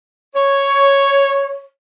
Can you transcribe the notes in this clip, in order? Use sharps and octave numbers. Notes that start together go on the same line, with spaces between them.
C#5